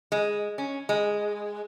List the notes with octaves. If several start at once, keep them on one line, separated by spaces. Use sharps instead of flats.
G#3
C#4
G#3